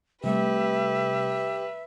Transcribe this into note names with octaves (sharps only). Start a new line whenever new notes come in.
C3 G3 A3 G4 B4 E5